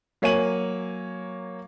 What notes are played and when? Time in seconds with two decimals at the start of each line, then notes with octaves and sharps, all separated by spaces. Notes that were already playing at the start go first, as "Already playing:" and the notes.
0.22 F#3 A#3 C#5 G#5 D#7 F#7